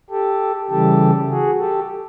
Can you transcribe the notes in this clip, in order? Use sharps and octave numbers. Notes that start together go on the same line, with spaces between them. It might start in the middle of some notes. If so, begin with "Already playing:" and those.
G4 A4
C#3 E3 G3 G4 A4
F#4 G#4
G4 A4